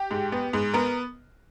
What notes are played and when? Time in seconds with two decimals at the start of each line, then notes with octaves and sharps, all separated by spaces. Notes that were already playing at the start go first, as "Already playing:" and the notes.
Already playing: G4
0.11 G#2
0.32 B3
0.53 G#2
0.74 B3 A#4